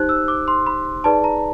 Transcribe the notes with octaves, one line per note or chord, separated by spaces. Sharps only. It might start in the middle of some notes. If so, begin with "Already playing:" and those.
Already playing: D#4 G4 C5 F#6
E6
D6
C6
B5
D#4 G#4 B4 D5 A5
A#5